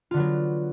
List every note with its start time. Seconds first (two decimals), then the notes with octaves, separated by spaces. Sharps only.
0.11 F4
0.14 D3
0.17 B3
0.19 F#3